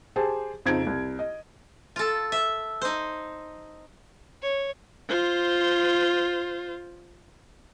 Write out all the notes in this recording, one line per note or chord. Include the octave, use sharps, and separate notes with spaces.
G4 G#4 C5 A5
F2 C#3 C4 D#4 G#6 D7
C2
D#5
F4 A4
E5
D#4 C5
C#5
F4 C5